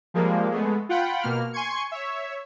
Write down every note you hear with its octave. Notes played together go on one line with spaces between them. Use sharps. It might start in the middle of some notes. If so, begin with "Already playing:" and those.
F3 G3 G#3 A#3
G#3 A3 B3
F4 F#5 G5 B5
B2 A#3 F6
G#5 C6 C#6 G#6 C#7
C#5 E5